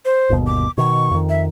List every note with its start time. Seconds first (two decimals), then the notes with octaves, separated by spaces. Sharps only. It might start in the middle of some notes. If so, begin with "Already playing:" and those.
0.05 C5
0.30 G1 D#2 B2
0.47 D6
0.78 B2 D#3 C#6
1.11 F2 D#3
1.29 E5